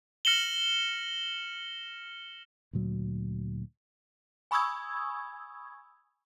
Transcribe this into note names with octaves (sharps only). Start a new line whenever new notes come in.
F6 A#6 C#7 E7 F#7 G7
D2 A#2 F#3
G#5 B5 C#6 D#6 E6 G#6